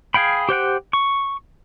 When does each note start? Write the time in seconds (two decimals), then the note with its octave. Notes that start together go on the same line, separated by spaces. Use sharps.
0.14 G#4 F5 G5 B5
0.49 G4 C5 F#5 G5
0.93 C#6